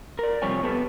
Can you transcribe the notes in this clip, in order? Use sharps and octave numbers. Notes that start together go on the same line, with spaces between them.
A#4 D5
C3 F3 G3 G4 C#5 G#5
B3 G4 A4 B4